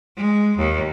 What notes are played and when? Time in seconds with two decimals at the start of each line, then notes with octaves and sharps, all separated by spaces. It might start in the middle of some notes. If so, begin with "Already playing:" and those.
0.17 G#3
0.58 D#2